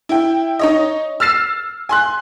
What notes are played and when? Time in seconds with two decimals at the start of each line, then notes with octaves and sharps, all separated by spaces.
0.09 E4 G5
0.59 D#4 C#5 D#5
1.20 E6 F6 A6 C7 E7
1.89 G#5 C6 F#6